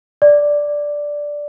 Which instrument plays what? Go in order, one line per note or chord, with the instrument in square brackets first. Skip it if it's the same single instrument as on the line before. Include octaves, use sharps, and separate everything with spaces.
[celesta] D5